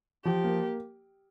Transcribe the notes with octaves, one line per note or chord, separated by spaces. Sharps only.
F3 G4
A#3